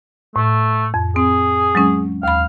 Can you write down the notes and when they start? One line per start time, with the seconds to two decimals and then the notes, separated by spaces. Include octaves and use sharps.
0.36 A2 A3
0.94 F2
1.16 C4 G#4
1.75 F#3 G#3 C#4
2.23 D#2 F5 B5